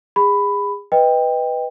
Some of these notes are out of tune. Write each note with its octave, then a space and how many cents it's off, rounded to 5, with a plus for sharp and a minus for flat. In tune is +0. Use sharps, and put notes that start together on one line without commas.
G#4 -30 B5 +10
B4 +0 D#5 +0 G5 +15